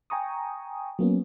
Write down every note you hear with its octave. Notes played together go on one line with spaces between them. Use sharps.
G5 G#5 A#5 C#6 D#6
F#3 A#3 B3 C#4